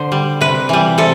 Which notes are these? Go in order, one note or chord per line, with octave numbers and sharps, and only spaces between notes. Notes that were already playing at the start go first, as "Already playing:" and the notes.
Already playing: D3 C5
G3
C3 B4
E3 G3
C3 A4